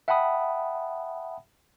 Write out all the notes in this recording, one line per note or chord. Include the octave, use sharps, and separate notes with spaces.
E5 F#5 G5 A5 B5 D#6